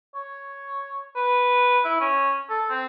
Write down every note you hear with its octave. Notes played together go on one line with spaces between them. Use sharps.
C#5
B4
E4
C#4
A4
C4